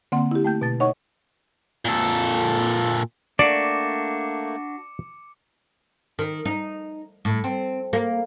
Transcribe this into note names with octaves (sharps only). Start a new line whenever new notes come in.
D3 A#3 C4 F#5 C6
E4 G4
A3 G5 G6
B2 A5 A6
D#4 C#5 D#5 F#5 C#6
A#2 A4
A3 A#3 D4 F#4 D5 D6 C#7 E7
D#3
D#4
A2
C4
A#3